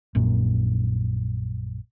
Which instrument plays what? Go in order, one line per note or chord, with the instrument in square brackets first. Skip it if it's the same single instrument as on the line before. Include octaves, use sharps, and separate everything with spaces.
[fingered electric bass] A#1 F#2 A#2